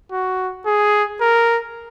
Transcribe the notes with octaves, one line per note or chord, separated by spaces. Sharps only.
F#4
G#4
A#4